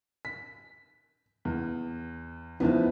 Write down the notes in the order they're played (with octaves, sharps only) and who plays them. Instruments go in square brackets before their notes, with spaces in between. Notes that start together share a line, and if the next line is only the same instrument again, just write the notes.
[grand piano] B6
E2
[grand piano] E2 F3 B3 [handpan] D#4 E4